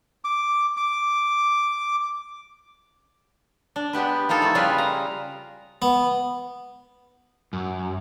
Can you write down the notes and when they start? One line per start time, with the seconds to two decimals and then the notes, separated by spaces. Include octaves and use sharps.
0.24 D6
0.77 D6
3.76 D4
3.93 G#3 B3 G4 B4
4.29 A#3 D#4 F4 A4
4.42 F3 A3 E4
4.55 C#3 G3 F4 G#4 B4 G#5
4.78 A#5
5.82 B3
7.53 F#2